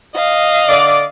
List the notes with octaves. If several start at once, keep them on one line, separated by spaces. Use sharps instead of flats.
D#5 F5
D3 D5